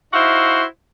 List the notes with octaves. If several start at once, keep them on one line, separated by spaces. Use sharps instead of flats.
D#4 E4 F#4 C5 E5 F5